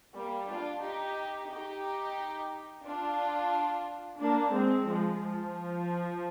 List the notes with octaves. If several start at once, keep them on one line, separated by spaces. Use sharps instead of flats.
G3 A#3
D4 F4
D#4 G4
D#4 G4
D4 F4
A#3 D4
G#3 C4
F3 G#3
F3